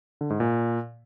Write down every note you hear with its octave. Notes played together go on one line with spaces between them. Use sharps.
D3
G#2
A#2